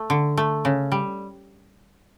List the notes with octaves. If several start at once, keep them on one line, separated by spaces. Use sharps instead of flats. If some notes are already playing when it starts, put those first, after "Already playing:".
Already playing: A3
D3
A3
C#3
G3